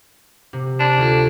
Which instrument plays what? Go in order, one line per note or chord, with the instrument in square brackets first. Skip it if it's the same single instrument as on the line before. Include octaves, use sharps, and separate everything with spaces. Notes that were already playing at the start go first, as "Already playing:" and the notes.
[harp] C3
[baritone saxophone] D4
[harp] D2 F4